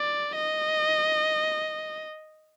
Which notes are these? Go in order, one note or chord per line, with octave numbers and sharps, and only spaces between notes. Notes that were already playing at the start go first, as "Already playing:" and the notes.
Already playing: D5
D#5